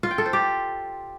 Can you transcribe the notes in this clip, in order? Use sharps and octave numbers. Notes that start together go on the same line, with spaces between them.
F4
G5
A4
C5
G4